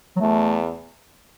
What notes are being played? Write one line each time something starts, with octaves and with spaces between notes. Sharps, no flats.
F#3
E2 A3